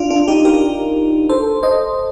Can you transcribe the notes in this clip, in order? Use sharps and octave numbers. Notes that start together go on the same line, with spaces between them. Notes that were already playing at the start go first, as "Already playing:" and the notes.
Already playing: D4 F4
D4 F4
D#4 G4
G4 A#4
A4 C5
C5 D#5